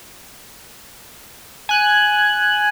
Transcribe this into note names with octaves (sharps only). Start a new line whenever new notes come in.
G#5 F#6